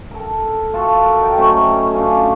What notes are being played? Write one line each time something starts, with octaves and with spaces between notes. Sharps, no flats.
A4 A#4
F4 F#4 A4 F#5
A#4
D#4 G5
F#3 A3 C#4 C5
C#4 D4 F4 F#4